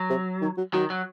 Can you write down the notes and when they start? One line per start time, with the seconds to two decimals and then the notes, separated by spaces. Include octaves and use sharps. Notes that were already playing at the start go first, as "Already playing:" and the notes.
Already playing: F#3
0.10 C3
0.42 D#3
0.57 F#3
0.73 D#3 F#3
0.90 F#3